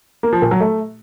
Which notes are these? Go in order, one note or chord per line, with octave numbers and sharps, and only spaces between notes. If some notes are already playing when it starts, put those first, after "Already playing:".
A#3
F3
A#2
F#3
A3